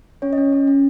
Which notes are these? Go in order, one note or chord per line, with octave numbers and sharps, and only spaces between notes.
C#4 C#5
D#5
C#4
C#4
C#4